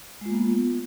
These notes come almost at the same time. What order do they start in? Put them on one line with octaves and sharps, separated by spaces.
G#3 F4 A#3 B3